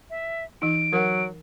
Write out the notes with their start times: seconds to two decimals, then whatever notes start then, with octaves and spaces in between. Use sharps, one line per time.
0.10 E5
0.62 E3 D#4 D7
0.93 F#3 A#4 F#5